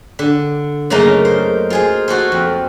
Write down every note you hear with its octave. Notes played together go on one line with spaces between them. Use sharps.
D3
F#2 C#3 A3 A#3 D#4 A#5
C5
F4 G#4 C5
F4 F#4 A4 C5
F2